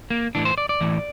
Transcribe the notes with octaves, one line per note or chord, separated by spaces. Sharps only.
A#3
A2 E3 D4
C5
D5
D5
A2 E3